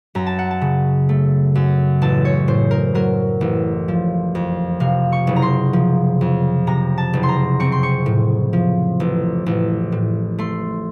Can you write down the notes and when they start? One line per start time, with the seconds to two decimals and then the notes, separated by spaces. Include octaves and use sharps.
0.15 F#2 A#5
0.26 A5
0.39 F#5
0.51 A5
0.61 C#3
1.09 A3
1.55 F#2
2.02 A1 A5
2.25 C#5
2.48 A2 C5
2.71 A#4
2.95 F#3 A#4
3.41 A1
3.88 F3
4.35 F2
4.80 C3 F5
5.12 C#6
5.27 F#1
5.36 A#5
5.42 C6
5.73 F3
6.21 F2
6.67 C3 A#5
6.98 A5
7.13 F#1
7.23 C6
7.29 A#5
7.60 C4 C#6
7.72 C6
7.83 C#6
8.06 A2
8.53 F3
9.00 A1
9.46 A1
9.92 A2
10.38 A3 C6